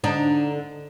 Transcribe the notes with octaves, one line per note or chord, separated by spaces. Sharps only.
D3 D4 D#4